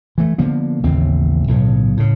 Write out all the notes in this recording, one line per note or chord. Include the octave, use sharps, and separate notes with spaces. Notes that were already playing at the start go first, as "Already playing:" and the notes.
E3 A3
D3 F3 A#3 B3
A1 D#2 C#3 C4
B1 A2 C#3
A2 C#3